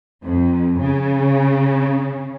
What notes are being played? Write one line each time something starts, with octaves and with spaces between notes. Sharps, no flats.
F2
C#3